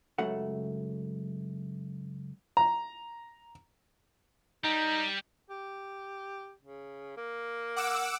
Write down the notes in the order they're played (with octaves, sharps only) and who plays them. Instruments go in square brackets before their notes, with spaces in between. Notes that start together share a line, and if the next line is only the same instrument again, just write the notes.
[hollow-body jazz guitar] C#2 F#2 C#3 F#3 A3 F#5
[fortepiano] A#5
[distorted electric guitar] G3 [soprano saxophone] D#4
[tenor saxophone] G4
C#3
A#3
[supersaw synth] F#5 D6 E6